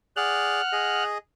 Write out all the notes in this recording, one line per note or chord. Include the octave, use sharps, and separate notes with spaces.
G#4 D5 F#5 F6 F#6
G#4 D#5